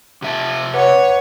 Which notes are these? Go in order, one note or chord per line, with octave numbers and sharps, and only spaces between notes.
C3 E5 A5
B4 C#5 F#5 D6